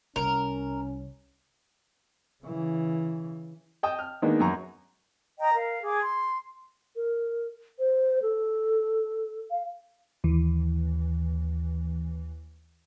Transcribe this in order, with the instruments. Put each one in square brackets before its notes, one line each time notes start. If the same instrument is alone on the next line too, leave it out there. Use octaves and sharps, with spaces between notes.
[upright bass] C2 [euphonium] C#4 [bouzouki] A#4
[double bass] C#3 E3
[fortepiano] D#5 G5 A5 D#6
F6
D#3 G#3 A#3 B3 D4 D#4
F#2 G#5 A#5 C#6
[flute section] D#5 G5 A#5
A#4 F5
G#4 D6
C6
[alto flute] A#4
C5
A4
F5
[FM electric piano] D#2 E3